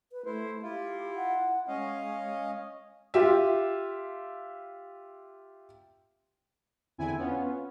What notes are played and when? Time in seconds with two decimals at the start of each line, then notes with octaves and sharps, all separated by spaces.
0.12 B4
0.26 A3 E4 C5
0.63 E4 F4 G4
1.15 F#5
1.68 G#3 C#4 D#5 F5
3.14 F4 G4 E5
6.98 E2 D3 C4 E4 G#5
7.17 B3 C#4 F4